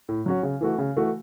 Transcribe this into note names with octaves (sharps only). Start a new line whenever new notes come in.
A2
F#3 C#4 F#4
C#3
E3 A3 F#4
C#3
E3 A3 F#4